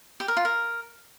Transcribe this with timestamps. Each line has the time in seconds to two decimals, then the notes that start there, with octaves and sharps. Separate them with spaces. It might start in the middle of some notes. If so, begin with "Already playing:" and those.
0.20 G4
0.28 A#4
0.37 F4
0.45 A#4